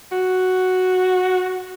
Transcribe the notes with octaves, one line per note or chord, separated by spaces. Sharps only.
F#4